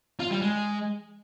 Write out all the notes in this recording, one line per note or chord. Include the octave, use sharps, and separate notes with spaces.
F4
G3
G#3